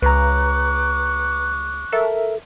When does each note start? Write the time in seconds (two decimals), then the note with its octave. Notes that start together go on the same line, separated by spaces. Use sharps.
0.02 C#2 B4 A#5 C#6 D6 F#6
1.92 A4 A#4 E5